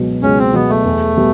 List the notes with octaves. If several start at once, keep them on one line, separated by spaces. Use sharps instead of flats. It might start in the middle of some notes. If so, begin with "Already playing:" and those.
Already playing: C#2 B2 F#3
C#2 C#4
C4
B2 F#3 B3
A3
E2
B2 G3 B3